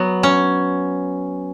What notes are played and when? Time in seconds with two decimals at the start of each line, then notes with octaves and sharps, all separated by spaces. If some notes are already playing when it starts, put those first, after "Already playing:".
Already playing: F#3 B3
0.23 C#4